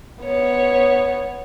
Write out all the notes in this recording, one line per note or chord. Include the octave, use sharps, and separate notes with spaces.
B3 C#5